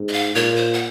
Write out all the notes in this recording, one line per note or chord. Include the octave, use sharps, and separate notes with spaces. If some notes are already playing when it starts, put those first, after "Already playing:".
Already playing: G#2
D#5
F5
A#2 C#5
C5
F#5